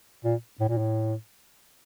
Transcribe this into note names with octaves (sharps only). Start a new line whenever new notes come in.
A#2
A2
A#2
A2